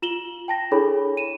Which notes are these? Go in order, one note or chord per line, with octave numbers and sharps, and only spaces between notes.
F4 E7 F#7 G7
G5 A5 A#6
D4 E4 G#4 A4 C#5 B5
D#7 E7